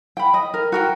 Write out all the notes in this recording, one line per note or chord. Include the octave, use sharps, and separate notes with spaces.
G5 B5
D#5
A#4
F#4 A#4 G5